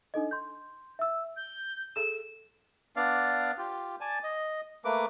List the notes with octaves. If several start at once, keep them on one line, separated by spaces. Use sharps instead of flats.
D4 D#4 A4 D#5
C6 G6
E5 E6
G6
G#4 A4 E7
B3 D4 D5 F5
F4 G4
D5 G#5 A5
D#5
A3 A#3 B4 D6